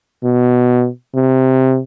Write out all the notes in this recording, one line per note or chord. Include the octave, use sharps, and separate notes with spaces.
B2
C3